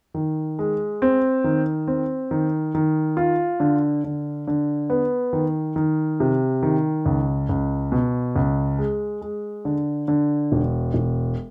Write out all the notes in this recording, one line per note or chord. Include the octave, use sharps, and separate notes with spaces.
D#3
G#3
C4
D#3
C4
D#3
D#3
F4
D3
D3
D3
B3
D#3
D#3
C3
D#3
C#2
C#2
B2
C#2
G#3
G#3
D3
D3
E1
E1